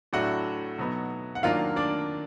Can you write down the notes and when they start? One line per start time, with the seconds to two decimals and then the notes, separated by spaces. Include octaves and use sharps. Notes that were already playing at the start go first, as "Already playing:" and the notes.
0.13 A2 F#3 A3 D4 F#4 F#5
0.78 B2 F#3 B3 D#4
1.35 F#5
1.43 D#3 F#3 A#3 D4 F4 F5
1.76 D4 D5